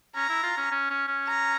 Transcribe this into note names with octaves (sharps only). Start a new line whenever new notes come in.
C#4 A#5
E4
F4
C#4
C#4
C#4
C#4
A#5